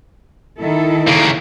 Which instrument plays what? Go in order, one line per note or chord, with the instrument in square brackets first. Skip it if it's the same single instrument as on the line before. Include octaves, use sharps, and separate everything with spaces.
[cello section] D#3 E4 A4
[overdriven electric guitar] C#3 A#3